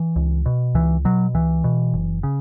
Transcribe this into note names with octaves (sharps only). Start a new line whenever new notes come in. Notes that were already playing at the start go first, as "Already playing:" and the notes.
Already playing: E3
C#2
B2
C#2 E3
B2 F#3
C#2 E3
B2
F#1
C#3